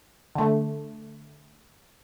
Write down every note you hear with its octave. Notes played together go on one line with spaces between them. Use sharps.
D3 A3